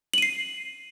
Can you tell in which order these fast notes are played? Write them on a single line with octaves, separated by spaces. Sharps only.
F#7 D#7 C7